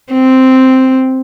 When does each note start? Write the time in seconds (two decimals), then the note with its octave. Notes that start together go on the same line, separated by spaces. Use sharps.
0.12 C4